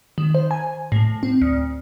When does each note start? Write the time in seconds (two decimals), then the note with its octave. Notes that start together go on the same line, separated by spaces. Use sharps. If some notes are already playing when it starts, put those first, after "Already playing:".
0.18 D#3
0.35 C5
0.51 G#5
0.92 A2
1.23 C4
1.42 D2